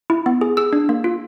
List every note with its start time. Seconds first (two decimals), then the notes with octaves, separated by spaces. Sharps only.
0.10 E4
0.26 B3
0.41 G#4
0.57 G#4 E6
0.73 D4
0.89 A#3
1.04 F4